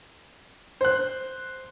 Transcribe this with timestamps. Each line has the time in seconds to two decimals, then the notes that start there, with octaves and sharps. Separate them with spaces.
0.81 C5 F#6